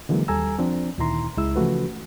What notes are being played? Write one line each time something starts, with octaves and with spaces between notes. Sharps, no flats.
D3 E3 F#3 G#3 A#3
D#2 G3 A4 G#5 A#5 E6
F3 C4 D4
D2 A#2 D#3 E4 A#5 C6
C#2 G#3 E4 E6
C#3 E3 F3 A3 F#4 B4